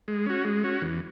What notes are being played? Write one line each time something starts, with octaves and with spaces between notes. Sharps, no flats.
G#3
C#4 F#4
G#3
C#4 F#4
E2